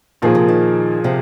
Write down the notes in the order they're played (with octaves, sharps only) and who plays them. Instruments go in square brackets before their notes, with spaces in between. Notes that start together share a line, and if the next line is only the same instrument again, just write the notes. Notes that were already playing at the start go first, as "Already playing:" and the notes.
[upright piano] A#2 F3 A#3 G#4 [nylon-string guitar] D#3
[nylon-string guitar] C3
D#3
C3 F3